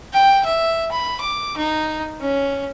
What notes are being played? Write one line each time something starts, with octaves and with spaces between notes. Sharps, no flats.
G5
E5
B5
D6
D#4
C#4